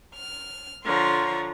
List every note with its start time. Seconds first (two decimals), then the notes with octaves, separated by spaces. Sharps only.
0.15 F6
0.85 D3 F3 C#5 A#5 C6